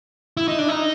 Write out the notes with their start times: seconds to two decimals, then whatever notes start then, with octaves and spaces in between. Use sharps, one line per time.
0.37 E4
0.48 D#4
0.59 D4
0.68 D#4